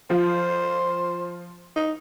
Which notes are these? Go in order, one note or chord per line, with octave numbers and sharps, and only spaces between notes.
F3 F4 C5
D#4